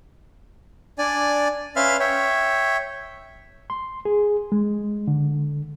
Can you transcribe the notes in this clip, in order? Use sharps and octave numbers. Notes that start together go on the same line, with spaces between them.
D4 D5 G#5
C#4 B4 E5 F5 C6 F6
C#5 E5 G5
C6
G#4
G#3
D3